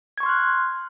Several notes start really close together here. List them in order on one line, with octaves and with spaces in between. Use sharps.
G#6 C#6 C6 F6 F#6